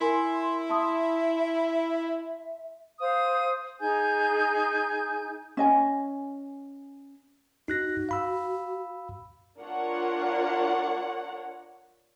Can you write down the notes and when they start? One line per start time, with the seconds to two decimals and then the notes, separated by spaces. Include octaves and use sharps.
0.01 E4 A#4 G#5 C6
0.70 E5 A5 C6 D#6
2.99 C5 F5 D#6
3.80 D#4 G#4 G#5 G6
5.57 C#4 D#5 G#5
7.68 D#4 F#4 F#6 A#6
8.09 F5 B5 E6
9.58 D4 F4 A#4 C#5 F#5